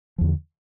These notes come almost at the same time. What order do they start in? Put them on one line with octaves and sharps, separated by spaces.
F3 E2 D3